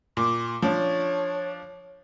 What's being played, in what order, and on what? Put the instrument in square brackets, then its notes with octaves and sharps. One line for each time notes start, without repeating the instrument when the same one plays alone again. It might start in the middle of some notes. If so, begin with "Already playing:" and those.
[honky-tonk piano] A#2 [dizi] D6
[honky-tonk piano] F3 D4 [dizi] C#5